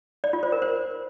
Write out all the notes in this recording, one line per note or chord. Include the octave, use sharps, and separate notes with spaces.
D5
F4
C5
A#4
C5